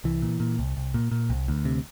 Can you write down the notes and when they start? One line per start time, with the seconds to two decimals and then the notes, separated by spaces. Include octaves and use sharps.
0.04 C2 E3
0.22 A#2
0.40 A#2
0.59 C2
0.77 C2
0.94 A#2
1.11 A#2
1.30 C2
1.48 D2
1.65 C3